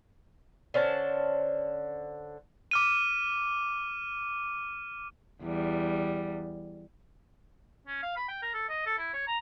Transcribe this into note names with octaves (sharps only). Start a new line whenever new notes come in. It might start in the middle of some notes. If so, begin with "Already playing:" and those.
D3 C#4 C5 A5
D6 F6 D#7
E2 G3
C#4
F5
B5
G5
A#4
A4
D#5
A4
E4
C#5
A#5